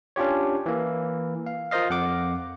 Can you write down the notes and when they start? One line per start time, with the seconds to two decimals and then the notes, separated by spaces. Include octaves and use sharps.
0.16 C#4 D4 F4 G4 C#5
0.66 E3 A#3
1.46 F5
1.71 F4 A#4 C5 D#5 F5
1.90 F2 F#5 D6